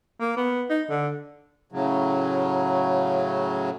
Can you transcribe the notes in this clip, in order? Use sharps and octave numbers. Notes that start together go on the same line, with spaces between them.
A#3
B3
D#4
D3
A2 C#3 F#3